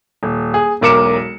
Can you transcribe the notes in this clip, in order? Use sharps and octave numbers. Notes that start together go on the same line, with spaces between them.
D#1
G#4
E1 B1 A#4 D6 C#7 E7